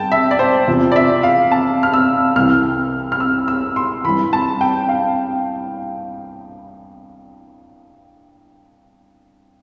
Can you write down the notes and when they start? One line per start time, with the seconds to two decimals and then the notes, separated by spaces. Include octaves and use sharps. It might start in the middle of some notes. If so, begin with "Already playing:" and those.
Already playing: G2 G5 A5
0.12 E5
0.31 D5
0.39 C5
0.67 E2 C3 F3
0.92 D5
0.96 E5
1.23 F5
1.52 A5
1.83 F6
1.94 E6
2.36 C2 C3 E3 F6
3.12 F6
3.20 E6
3.48 E6
3.76 C6
4.04 G2 E3 B5
4.33 A5
4.61 G5
4.89 F5